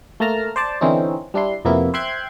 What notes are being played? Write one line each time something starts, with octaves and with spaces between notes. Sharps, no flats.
A3 A#3 A5 A#5 F6
C5 D5 A5
D3 E3 C4 C#4 D#4
G3 D4 E4 C6
F2 C3 A#3 B3 E4
C5 E5 G5 C6 F#6 G#6